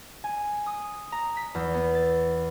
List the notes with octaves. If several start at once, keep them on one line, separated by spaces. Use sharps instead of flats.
G#5
D#6
A#5
B6
E2
B3
A6